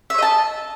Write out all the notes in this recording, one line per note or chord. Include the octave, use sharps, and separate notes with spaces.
C#5 D#5 E5 A5